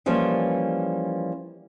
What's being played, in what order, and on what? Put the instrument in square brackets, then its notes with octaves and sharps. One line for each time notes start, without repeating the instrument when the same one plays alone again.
[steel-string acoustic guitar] E3 F3 G3 A#3 C#4